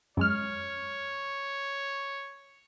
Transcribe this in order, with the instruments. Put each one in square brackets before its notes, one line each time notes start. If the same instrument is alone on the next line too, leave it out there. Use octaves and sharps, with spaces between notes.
[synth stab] F#2 G#3 F6 [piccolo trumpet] C#5